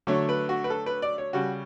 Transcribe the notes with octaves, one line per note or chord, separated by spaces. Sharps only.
D3 F#3 A3 C#5
B4
F#4
B4
A4
B4
D5
C#5
C#3 G3 F#4